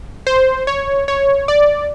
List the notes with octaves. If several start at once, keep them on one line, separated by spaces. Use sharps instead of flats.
C5
C#5
C#5
D5